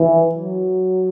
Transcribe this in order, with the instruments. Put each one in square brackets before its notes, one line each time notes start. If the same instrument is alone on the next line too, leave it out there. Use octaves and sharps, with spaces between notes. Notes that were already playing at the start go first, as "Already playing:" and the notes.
Already playing: [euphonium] E3
F#3